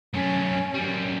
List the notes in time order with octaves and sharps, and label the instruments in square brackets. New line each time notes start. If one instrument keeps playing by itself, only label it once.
[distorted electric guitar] F#2 A3 [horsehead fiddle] C#4
[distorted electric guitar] F#2 G3